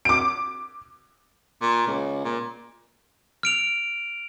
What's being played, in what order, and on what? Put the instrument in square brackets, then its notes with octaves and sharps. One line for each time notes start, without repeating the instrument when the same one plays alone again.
[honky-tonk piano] D6 D7
[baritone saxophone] A#2
C#2
A#2
[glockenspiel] F6 D7 F7